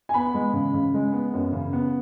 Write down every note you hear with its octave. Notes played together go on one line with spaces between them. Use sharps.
G#5
B3 B5
G#3
C#3
C#3
G#3
B3
F#2
C#3
B3